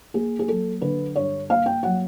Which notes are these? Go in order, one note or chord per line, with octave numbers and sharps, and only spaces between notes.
A#3 G#4
G#4
F#3 A4
D3 B4
G2 C#5
A#3 F5
G5
F#3 F#5